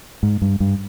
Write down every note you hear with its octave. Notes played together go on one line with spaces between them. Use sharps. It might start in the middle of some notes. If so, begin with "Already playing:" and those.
G#2
G2
G2